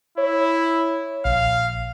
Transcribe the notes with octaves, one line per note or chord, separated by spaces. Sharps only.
E4 C#5
A#1 F5